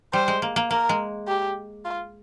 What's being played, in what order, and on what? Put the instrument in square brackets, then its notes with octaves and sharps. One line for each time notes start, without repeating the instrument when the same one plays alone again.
[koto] G3 [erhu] C5
[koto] G#3
A#3
A#3
[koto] A#3 [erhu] A#4
[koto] G#3
[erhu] G4
F4